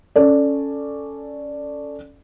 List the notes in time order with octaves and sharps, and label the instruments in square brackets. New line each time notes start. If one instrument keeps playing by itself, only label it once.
[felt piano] C#4 A4 D5